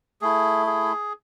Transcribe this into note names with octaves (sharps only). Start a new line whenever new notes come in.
A3 E4 G#4
G#4